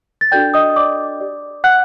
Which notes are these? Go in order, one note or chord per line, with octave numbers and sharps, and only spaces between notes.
A6
D4 F#4 A4 D5 G5 G6
D#5 D#6
D#6
D5 D6
G4 D5
F#5 F#6